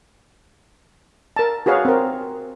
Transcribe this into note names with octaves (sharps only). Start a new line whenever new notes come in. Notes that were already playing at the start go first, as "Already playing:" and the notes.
A#4 A5
F#4 G#4 B4 C#5 F5
C4 A#4